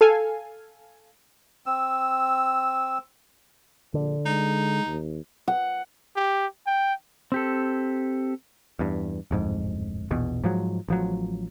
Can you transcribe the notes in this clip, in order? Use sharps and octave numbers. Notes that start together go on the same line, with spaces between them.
A4 F5 G#5
C4 E6
A#1 D3
G#3 D#4
D#2
F#5
G4
G5
C4 G4 A4
E2 G2
D1 F2 G#2
A#1 E2 B2
G#2 F3 F#3
A1 F3 F#3